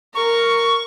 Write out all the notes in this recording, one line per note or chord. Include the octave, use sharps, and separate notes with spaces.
A#4 C#6